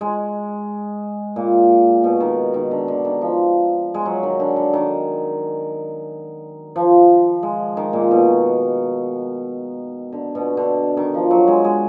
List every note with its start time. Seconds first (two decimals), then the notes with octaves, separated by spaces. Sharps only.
0.01 G#3
1.36 A#2
2.04 B2
2.20 D#3
2.54 D#3
2.71 D3
2.88 D3
3.05 D#3
3.22 F3
3.94 G#3
4.05 F#3
4.23 D#3
4.40 D3
4.56 D3
4.73 D#3
6.76 F3
7.43 G#3
7.77 D#3
7.93 A#2
8.11 B2
10.13 D3
10.35 B2
10.57 D3
10.97 D#3
11.14 F3
11.31 F#3
11.48 G#3
11.65 G#3